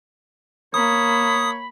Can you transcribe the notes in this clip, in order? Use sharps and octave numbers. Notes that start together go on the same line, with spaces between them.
A#3 C#5 B5 D#6